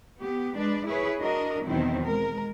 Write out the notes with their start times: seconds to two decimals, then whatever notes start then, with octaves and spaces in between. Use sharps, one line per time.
0.20 B3 G4
0.56 G#3 D4 B4 D5
0.86 E4 G#4 B4 C#5
1.20 D4 F#4 A#4 D#5
1.65 E2 B2 D#3 F#3 C4 E4
2.04 G#3 A#4